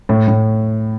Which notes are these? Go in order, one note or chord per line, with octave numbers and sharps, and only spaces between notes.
A2
A2